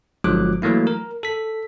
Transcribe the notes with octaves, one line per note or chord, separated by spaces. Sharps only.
G1 F3 F#3 G#3 D6 F#6
E3 F#3 A3 A#3 E4
A#4
A4 B6